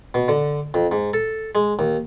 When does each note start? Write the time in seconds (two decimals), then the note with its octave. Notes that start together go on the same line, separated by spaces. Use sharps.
0.14 B2
0.28 D3
0.74 F2
0.92 G#2
1.14 A4
1.55 G#3
1.79 D#2